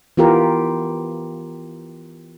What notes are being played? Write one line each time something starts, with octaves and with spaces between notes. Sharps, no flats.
E3 B3 F4 G4 A#4